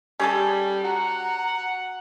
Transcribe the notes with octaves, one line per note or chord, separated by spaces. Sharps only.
G3 C#4 G#4 A4
F#4 F#5 A#5